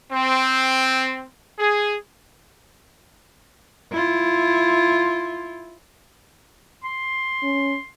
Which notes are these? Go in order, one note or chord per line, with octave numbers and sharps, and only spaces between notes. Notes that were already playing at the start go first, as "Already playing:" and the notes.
C4
G#4
E4 F4
C6
C#4